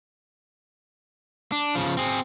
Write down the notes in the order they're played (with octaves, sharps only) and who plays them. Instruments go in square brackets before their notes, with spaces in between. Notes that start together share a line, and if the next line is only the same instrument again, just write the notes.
[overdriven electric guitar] D4
C#3 F3
C4 G#4